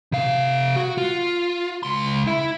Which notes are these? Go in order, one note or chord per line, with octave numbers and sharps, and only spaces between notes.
C3 F5
F#4
F4
C#2 C6
E4